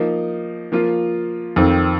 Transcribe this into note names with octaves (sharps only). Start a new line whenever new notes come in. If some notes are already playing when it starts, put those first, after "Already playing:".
Already playing: F3 A#3 D#4
F3 A#3 F4
F2 D#3 C4